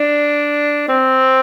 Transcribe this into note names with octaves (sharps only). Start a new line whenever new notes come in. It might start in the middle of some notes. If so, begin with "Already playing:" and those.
Already playing: D4
C4